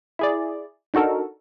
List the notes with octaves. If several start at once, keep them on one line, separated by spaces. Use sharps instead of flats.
E4 G#4 D5
D4 D#4 F#4 A4 A#4